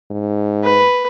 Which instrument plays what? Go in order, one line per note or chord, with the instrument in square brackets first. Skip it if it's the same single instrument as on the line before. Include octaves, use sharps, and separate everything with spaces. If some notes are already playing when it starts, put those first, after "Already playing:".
[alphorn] G#2
[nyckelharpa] B4